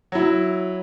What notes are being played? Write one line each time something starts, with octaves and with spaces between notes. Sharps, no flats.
F#3 E4